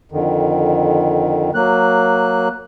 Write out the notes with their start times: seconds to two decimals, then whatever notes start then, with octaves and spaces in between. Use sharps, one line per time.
0.12 F2 D3 D#3
1.55 F#3 A#3 F#6